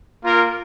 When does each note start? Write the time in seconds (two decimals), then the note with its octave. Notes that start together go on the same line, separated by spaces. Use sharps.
0.23 A#3 F4 A#4